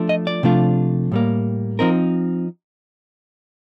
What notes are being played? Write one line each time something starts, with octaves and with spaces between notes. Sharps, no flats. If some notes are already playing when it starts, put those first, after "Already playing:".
Already playing: F3 A3 D4 F4
D#5
D5
C3 F3 A3 D4 F4
A2 G3 A#3
F3 C4 D#4 A#4